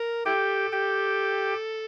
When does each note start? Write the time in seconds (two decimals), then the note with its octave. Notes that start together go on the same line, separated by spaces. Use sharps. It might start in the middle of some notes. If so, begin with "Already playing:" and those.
Already playing: A#4
0.25 E4 G4 A4 G5
0.72 G4 G5